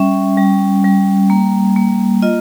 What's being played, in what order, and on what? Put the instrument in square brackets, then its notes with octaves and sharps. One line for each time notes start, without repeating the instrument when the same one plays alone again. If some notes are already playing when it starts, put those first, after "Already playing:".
Already playing: [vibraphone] G3 C#4 E5
G3
G3
A#3
A#3
F4 D#5